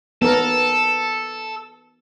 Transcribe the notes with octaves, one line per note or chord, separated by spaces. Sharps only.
B3 A4 A#4